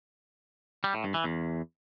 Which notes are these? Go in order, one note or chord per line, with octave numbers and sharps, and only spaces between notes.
G3
A2
G2
E3
E2